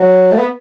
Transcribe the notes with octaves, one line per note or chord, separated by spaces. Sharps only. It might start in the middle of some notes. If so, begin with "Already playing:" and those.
Already playing: F#3
A3
B3